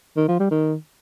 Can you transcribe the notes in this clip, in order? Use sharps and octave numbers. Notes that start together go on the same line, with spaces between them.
D#3
F3
G3
D#3